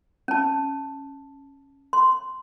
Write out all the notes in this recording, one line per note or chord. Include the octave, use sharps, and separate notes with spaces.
C#4 A5
C6